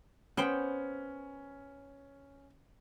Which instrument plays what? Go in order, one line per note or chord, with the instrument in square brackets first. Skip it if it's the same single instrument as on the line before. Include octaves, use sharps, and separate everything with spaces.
[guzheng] B3 C5 G5 [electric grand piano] C#4